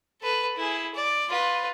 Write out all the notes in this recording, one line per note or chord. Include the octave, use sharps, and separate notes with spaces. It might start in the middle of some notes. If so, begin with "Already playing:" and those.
A4 B4
E4 G#4
D5
F4 B4